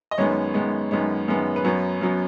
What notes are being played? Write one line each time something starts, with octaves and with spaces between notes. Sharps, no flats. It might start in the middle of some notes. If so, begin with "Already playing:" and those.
D#5
F#2 D#3 G#3 B3 C#5
F#2 D#3 G#3 B3
F#2 D#3 G#3 B3 C#5
F#2 D#3 G#3 B3
B4
F#2 F#3 B3 C#5
F#2 F#3 B3